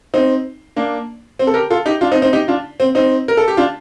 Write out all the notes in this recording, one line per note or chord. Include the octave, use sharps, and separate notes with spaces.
C4 D#4
A#3 D4
C4
A4
G4 A#4
F4 A4
D#4 G4
D4 F4
C4 D#4
C4 D#4
D#4 G4
D4 F4
C4
C4 D#4
A#4
A4
G4
D4 F4